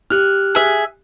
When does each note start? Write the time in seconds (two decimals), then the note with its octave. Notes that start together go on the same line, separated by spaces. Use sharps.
0.10 G4 F6 F#6
0.55 G#4 E5